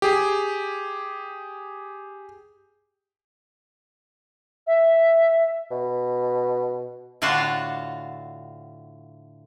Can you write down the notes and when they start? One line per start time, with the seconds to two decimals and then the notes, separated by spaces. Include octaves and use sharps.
0.02 G4 G#4
4.67 E5
5.71 B2
7.22 A2 D3 F4 F#4 F5 A5